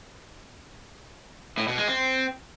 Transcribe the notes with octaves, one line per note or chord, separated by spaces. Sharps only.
A2
B2
G#3
C4